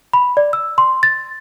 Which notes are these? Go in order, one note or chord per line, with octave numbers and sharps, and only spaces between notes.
B5
D5
E6
C6
A6